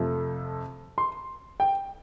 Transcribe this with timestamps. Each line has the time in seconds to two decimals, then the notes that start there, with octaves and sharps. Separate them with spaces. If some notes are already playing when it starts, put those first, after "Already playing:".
Already playing: F2 C3 F3 A3
0.98 C6
1.60 G5